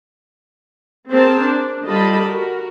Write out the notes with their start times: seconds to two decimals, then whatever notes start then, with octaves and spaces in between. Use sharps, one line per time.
1.10 C4 G#4 A#4 C5 A5
1.41 D4
1.85 D3 G3 F4 D#5 A5 B5
2.20 F#4 A#4